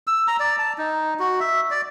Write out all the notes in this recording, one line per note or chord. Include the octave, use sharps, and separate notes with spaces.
E6
A#5
D5
A5
D#4
F#4
E5
D5